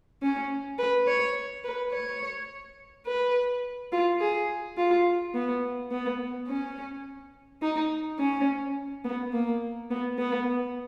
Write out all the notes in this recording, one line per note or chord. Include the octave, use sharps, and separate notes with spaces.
C#4
B4
C#5
B4
C#5
B4
F4
G#4
F4
B3
B3
C#4
D#4
C#4
B3
A#3
B3
B3